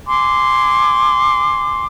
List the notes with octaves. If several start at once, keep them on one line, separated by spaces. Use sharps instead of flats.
G#5 C6 D6